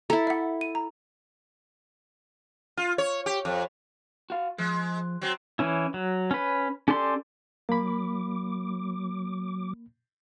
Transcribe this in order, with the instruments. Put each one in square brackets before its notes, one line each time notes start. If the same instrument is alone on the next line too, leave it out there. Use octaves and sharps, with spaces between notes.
[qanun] E4 A4 [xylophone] A#5
[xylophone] E5 F#5
D#7
A#5
[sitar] F4
C#5
G4
F2
[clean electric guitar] F#4 F5
[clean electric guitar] F3 [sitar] G#3
[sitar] F#3 C4
[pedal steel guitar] E3 C#4 E4
F#3
C#4 B4
C#4 G4 A4 D5 C6
[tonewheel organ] F#3 D6 [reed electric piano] A#3 B5